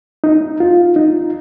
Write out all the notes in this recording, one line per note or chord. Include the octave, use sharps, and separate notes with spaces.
D#4
F4
D#4